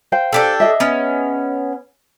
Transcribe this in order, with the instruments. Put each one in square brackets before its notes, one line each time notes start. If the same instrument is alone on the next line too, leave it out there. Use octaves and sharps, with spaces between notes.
[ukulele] C5 F5 G5
[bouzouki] D4 G4 A4
[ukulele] G#4 D#5 E5
[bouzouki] B3 C#4